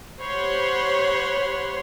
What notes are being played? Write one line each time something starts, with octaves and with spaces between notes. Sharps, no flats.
G4 C5 C#5 F#5 B5 C6